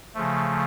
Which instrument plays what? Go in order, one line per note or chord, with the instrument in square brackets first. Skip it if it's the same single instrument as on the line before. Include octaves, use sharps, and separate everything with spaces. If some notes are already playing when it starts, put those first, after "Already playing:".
[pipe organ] C#3 F3 A3